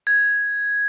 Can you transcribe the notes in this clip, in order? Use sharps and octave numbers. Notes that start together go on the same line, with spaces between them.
G#6